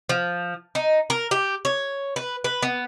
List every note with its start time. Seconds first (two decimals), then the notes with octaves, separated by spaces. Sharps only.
0.09 F3
0.75 D#4
1.10 A#4
1.31 G4
1.65 C#5
2.16 B4
2.44 B4
2.63 B3